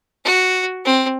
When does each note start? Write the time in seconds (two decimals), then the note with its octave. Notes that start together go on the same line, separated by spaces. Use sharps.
0.25 F#4
0.85 C4